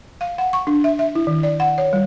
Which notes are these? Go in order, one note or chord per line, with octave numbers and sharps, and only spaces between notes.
F5
F#5
C#6
D4
E5
E5
E4
D#3
D5
F#5
C#5
G3